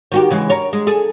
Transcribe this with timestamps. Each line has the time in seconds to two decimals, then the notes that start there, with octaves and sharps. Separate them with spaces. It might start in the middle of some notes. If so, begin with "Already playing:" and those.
0.12 D#3 F#4 G4
0.30 C#3 E3 G#3
0.50 A#4 C#5
0.73 G#3
0.87 G#4 A4